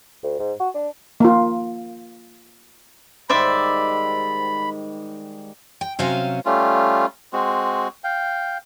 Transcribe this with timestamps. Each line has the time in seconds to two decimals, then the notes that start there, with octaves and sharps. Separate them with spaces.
0.23 D2
0.39 G#2
0.60 F#4
0.75 D4
1.20 A#3 F4
3.29 G#2 D#3 G3 C5 D5 E5 B5
5.81 G5
5.99 C3 F#3 C#4 C5 F5 G#5
6.45 G3 A3 C#4 F4
7.33 G#3 C4 F#4
8.04 F5 G5